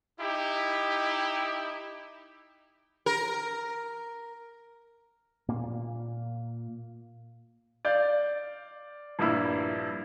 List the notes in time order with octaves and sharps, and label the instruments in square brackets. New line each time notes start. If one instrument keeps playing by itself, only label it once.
[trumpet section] D#4 E4 G4
[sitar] A#4
[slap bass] A#2 A#3
[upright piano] D5 F5 G6
A#1 G2 A#3 E4 E6